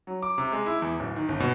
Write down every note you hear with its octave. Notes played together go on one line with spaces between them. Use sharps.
F#3
D6
C3
G#3
E4
E2
D1
D#3
G1
B2